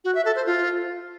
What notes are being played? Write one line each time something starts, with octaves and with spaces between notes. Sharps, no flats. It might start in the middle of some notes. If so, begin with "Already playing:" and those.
F#4
E5
A4
C5
F4